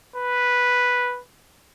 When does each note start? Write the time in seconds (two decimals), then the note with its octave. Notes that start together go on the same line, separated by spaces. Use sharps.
0.16 B4